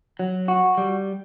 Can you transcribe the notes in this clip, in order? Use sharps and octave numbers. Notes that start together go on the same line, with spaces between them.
F#3
F#4
G3